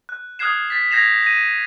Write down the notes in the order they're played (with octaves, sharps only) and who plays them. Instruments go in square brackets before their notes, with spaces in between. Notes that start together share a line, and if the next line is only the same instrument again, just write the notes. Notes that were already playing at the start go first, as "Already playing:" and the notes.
[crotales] F#6
D#6 F6 F#6 G#6 C7 E7
A6 B6 C7
G6 G#6 A#6 C7 E7 F7
A#6 D#7